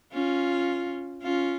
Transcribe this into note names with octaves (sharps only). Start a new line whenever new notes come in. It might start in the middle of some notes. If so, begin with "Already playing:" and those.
C#4 F4
C#4 F4